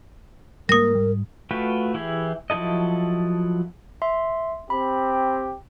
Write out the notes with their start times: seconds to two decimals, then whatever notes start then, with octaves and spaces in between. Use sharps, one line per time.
0.69 G#2 G3 A#3 A#4 D#6 A#6
0.95 G3
1.51 A3 F4 F#4 B4 G5
1.94 E3 E4 G4 G#4
2.50 F3 F#3 E4 A4 D#5
4.02 E5 C6
4.70 C4 G4 B5